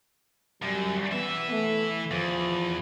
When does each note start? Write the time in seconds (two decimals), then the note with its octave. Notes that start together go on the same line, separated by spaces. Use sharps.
0.63 F#2 G3
1.12 E3 B3 E5
1.51 A3
2.11 E2 F3